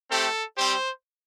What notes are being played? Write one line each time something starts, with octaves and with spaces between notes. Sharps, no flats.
A3 C4 G4 A4
G3 C4 G4 C5